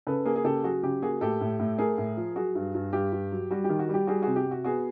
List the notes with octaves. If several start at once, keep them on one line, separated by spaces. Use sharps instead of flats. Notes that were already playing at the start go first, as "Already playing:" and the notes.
C#3 A4 B4
A#3 G#4 A#4
G#4
C#3 G4 A4
F#3 F#4 G#4
C#3 G4
A#3 F#4 G#4
A2 G4 A4
A2
A2
A3 G#4 A#4
A2
F3
F#3 F#4 G#4
G2
G2
G2 G4
G2
F#3
G3 F#4
G4
D#3
F#4
G3
G4
G3 F#4 G#4
C3 F#4 G#4
G4
C3
F#4
B3 F#4 G#4